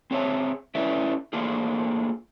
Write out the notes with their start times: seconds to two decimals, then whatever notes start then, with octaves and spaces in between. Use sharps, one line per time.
0.11 C4 G#4 C#5 D5 E5 A5
0.75 A3 C#4 E4 B4 D5 E5
1.33 A3 A#3 D4 F4 G#4